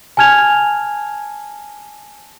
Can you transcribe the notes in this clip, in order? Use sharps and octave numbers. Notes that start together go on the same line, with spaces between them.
G#5 A5 F6 G#6 F7